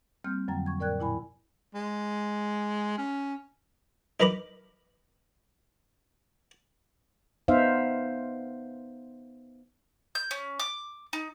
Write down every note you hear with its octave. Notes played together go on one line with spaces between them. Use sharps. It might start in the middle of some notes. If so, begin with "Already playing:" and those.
G3 A#3 C4 F6 G6
F2 D3 F3 F#3 G5 A#5
C#6 G#6
A2 A#4 D5 G5 F#6 G#6
A#2 E4 G#5 B5
G#3
C#4
D#4 A#4 B4 A#5 B5 D6
B3 D#4 C5 E5 F5
G6
C#4
D6
D#4